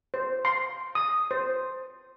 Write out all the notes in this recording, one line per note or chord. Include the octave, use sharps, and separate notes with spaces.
C5
C6
D#6
C5